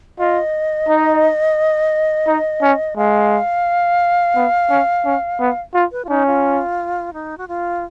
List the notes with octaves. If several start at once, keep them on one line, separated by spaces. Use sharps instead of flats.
F4 D#5
D#4
D#4
C#4
G#3 F5
B3
C#4
C#4
B3
F4
B4
F4
C#4 D#4
F4
D#4
F#4
F4